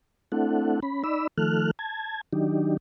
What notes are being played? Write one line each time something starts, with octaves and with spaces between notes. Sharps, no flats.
A3 C4 D4 E4 A4 F#5
C#4 B5
D#4 D5 B5 E6
D#3 F3 A3 A4 F6 F#6
A5 G#6
D#3 F#3 D4 D#4 G4